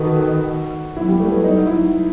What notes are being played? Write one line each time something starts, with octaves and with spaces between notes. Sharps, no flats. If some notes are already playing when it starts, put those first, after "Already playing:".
Already playing: D#3 F#4 A4 B4
F#3 E4
G3
A3
B3
F#3 D#4
E4